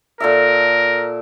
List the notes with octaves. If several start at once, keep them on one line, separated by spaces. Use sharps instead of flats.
A#2 A4 A#4 E5